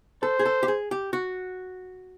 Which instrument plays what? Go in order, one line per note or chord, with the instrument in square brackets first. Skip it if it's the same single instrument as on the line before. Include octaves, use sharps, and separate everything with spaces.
[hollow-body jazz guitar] A4 [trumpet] C5
[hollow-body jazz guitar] G#4
A4
G4
G#4
G4
F#4